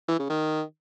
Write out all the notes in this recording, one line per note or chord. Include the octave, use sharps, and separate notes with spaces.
E3
C#3
D#3